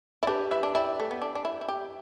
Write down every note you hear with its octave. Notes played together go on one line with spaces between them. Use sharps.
E4 D5
D4 G4 B4
E4 B4 E5
D4
E4 D5 G5
A3
B3
D4
D4
E4
E4
G4